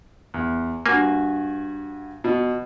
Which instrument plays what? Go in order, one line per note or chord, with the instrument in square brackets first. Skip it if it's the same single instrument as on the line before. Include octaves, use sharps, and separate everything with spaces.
[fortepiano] E2
[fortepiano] G2 F#4 G#5 [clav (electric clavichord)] A#3
[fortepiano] B2